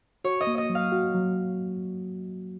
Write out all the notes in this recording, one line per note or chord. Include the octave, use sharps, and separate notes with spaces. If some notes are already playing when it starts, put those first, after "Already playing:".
F#4 C#5
D#5
A#3
D#5
F#3
F5
F#4
F#3